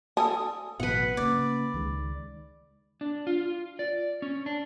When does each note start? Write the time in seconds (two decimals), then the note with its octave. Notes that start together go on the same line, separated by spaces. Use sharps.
0.17 A4 G#5 A5 D#6
0.80 A1 B2 F#3 B4 F#5
1.17 C#3 A#3 D5
1.74 C#2 D#3 G#3
3.01 D4
3.27 F4
3.79 D5
4.22 C#4
4.46 D4